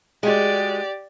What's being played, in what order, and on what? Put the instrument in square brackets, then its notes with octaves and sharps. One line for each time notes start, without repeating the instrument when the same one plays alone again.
[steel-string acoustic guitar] G#3 F#4 [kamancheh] G4 D5